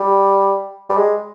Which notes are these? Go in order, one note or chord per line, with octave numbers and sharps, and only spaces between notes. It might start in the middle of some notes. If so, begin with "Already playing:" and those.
Already playing: G3
G3
G#3